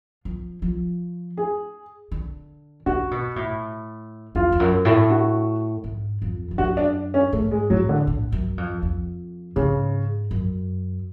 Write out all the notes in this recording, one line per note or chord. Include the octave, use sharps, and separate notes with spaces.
F3
F3
G#4
D3
C#3 F#4
B2
A2
F2 F4
F2
F#2
A2
F#4
G#2
F2
F2
F#2 F#4
D4
C#4
G#2 A3
G#3
A2 F#3
D3
A2
F#2
F2
F2
G#2 C#3
F#2